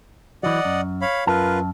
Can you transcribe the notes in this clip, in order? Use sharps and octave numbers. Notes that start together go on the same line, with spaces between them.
E3 F#3 D5 D#5 F#5
F#2
C#5 F5 B5
F#2 F4 A#4 B4 A5